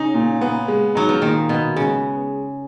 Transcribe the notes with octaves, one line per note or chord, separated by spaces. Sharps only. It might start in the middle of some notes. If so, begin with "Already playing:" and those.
Already playing: C#3 D#4
A#2
B3
G#3
F#3 D#4
F3
A#2 D#3
B2 B3
C#3 G#3